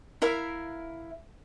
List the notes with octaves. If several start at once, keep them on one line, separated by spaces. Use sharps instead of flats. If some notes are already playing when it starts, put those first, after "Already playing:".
E4 A#4 E5 F5